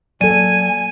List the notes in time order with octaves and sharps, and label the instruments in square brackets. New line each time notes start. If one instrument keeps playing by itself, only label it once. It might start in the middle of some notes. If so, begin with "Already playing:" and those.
[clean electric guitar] F#3 D5 [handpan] A#3 A4 [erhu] G#5 [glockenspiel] D#7